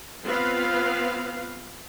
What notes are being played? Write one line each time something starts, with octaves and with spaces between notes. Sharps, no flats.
B3 C4 F4 B4 F5